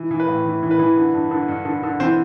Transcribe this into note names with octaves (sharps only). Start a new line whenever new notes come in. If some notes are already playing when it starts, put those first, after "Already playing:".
Already playing: E3
E3
B4
A2
E3
E3
B4
E3
D3
G2
D3
G2
D3
D3
E3 C4 C5